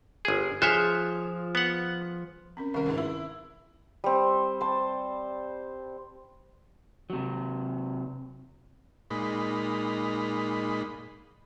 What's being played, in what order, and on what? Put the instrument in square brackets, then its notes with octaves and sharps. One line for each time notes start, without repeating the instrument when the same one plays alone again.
[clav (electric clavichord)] G1 G#4
[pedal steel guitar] F3 F4 F#6 [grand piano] G#4 F6 [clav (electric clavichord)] C5 C#5 E5
[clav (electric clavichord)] B3 F#5
[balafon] C4 C#4 A#4
[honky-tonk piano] C2 A#4 [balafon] D#3 C#4
[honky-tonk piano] F1 G#2
E4
[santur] G3 C4
C5 A5
[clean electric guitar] C3 F#3
[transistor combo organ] A#2 G#3 D#4 B5